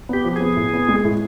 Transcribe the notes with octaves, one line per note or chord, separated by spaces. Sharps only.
B3 G4
F3
B3 G#4
A2
B3
G#3
A2